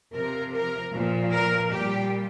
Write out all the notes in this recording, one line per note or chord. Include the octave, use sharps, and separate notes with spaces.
C3 F3 A#4
A#4
A#2 F3
A#4
A#2 G3 G4